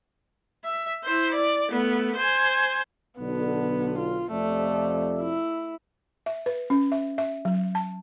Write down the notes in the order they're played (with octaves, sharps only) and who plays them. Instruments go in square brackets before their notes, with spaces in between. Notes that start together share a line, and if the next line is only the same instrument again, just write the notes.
[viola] E5
E4 C5
D5
A3 B3
C5 G#5
[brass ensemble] B1 D3 [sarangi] B3
[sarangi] F4
[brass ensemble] F2 C3 D5 [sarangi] A3
[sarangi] E4
[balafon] E5
B4
C#4
E5
E5
F#3
A5